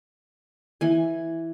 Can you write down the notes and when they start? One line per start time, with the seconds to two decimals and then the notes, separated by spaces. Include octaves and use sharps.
0.81 E3 G#5